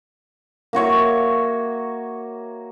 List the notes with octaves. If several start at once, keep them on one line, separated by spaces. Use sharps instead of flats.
A#3 F#4 C#5 E5